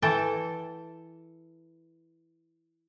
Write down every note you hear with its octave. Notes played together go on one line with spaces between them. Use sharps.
E3 A4 G5 A5